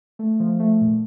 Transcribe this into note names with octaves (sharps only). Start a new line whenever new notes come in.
A3
F3
A3
A#2